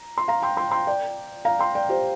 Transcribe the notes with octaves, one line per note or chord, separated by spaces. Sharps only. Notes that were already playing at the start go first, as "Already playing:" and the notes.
Already playing: A#5
C6
F5 A#5
G5 C6
G5 C6
G5 C6
D5 G5
F5 A#5
G5 C6
D5 G5
G4 C5